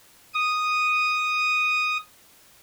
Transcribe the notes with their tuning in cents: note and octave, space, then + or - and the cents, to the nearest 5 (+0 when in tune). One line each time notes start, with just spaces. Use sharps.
D#6 -5